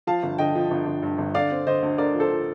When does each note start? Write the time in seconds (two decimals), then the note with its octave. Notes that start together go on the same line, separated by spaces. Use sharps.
0.07 F3 F5 A5
0.23 G1
0.38 D3 D#5 G5
0.55 F3
0.71 G1
0.86 G1
1.02 G2
1.18 G1
1.34 D3 D5 F5
1.51 C4
1.67 D3 C5 D#5
1.82 D2
1.98 D3 A#4 D5
2.14 F3
2.20 A4 C5
2.30 F3